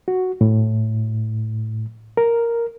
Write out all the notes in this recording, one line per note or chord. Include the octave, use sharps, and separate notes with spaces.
F#4
A2
A#4